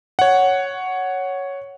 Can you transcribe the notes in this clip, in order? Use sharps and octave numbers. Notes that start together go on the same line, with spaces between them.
C#5 F#5